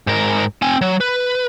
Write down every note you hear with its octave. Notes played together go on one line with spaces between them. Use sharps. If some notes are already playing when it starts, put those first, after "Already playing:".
G#2 A#4
C4 G#5
F#3
B4